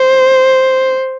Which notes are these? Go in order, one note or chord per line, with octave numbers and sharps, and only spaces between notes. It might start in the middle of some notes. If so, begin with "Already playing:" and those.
Already playing: C5